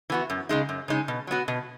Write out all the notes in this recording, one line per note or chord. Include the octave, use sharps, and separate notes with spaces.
E3 B3 F#4
F#2
C#3 G#3 D#4
F#2
C#3 G#3 D#4
B2
F#3 B3 F#4
B2